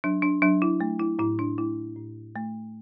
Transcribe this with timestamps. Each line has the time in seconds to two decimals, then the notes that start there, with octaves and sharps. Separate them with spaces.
0.04 F#3 D4
0.22 D4
0.42 F#3 D4
0.62 E4
0.81 A3
0.99 E4
1.19 A2 E4
1.39 D4
1.58 A3 E4
1.96 A2
2.35 A3